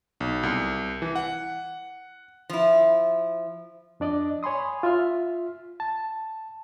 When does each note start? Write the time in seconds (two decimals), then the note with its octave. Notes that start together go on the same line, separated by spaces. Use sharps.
0.20 B1
0.43 C2
1.02 E3
1.16 F#5
2.50 F3 E4
4.00 F2 D4 D5 D#5
4.43 C#5 G#5 B5 C6 D#6
4.83 F4 E5 F6
5.80 A5